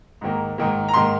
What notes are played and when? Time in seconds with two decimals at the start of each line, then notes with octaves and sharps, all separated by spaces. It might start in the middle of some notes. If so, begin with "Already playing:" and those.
0.21 G#2 D#3 A#3
0.58 G#2 D#3 A#3
0.88 A#5
0.94 G#2 D#3 A#3 C6